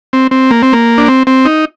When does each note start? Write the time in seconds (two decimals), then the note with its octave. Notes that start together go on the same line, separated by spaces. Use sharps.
0.13 C4
0.31 C4
0.51 A#3
0.63 C4
0.73 A#3
0.98 D4
1.08 C4
1.27 C4
1.45 D#4